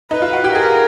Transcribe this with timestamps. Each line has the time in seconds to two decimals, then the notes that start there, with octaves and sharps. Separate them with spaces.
0.11 D#4 B4
0.22 F4
0.33 F#4
0.44 G4
0.55 G#4 A#4